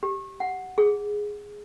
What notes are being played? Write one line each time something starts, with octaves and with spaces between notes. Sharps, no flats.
G4
F#5
G#4